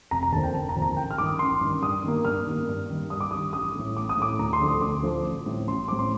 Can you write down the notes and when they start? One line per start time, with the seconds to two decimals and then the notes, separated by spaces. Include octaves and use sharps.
0.11 F1 A#5
0.23 A#5
0.32 D#2 D3 F3 C4 A5
0.43 G5
0.54 F1 A5
0.69 A#5
0.75 D#2 D3 F3 C4
0.82 A#5
0.97 A1 G5
1.11 F6
1.18 G2 D#3 D6
1.26 D#6
1.39 A1 C6
1.61 G2 D#3
1.82 G2 D#6
2.04 D#3 A#3
2.25 G2 F6
2.47 D#3 A#3
2.68 G2
2.90 D#3 G3
3.10 G2 D#6
3.21 D6
3.31 D#3 G3 D#6
3.53 A1 D#6
3.76 A2 A3
3.97 A1 D6
4.09 D#6
4.17 A2 A3 D6
4.39 D2 A#5
4.53 C6
4.60 D3 F3 A3
4.68 D#6
4.82 D2 D6
5.03 D3 F3 A3
5.24 A1
5.46 A2 G3 C4
5.67 A1 C6
5.88 A2 G3 C4 D6
5.99 C6